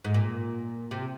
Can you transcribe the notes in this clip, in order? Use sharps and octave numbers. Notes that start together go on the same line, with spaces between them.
G#2
A#2
C3